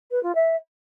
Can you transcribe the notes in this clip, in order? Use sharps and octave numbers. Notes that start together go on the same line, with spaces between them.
B4
F4
E5